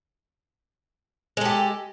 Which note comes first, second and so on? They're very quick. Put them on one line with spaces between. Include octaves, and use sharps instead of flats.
G#3 A4 G4